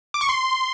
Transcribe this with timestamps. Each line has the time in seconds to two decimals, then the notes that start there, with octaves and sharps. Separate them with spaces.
0.14 D6
0.21 C#6
0.29 C6